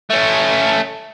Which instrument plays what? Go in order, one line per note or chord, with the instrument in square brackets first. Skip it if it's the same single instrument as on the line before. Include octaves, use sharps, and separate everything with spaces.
[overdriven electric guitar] A3 C#4